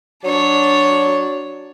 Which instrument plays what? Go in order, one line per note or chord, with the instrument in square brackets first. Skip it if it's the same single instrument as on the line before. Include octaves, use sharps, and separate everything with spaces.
[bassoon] F#3 [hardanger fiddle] D4 C#5